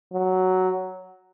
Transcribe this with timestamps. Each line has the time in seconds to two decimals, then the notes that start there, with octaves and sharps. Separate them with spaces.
0.13 F#3